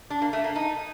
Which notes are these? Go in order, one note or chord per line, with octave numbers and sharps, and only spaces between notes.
D4
A#3
A3
A#3
D#4